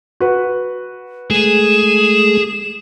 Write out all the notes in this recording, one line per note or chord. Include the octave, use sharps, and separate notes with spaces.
F#4 B4
G#3 A3 G#4 E7